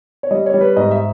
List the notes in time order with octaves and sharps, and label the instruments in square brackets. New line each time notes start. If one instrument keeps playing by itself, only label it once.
[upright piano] C#5
G3 D#5
C#5
G3
B4
G#2 D#5
E5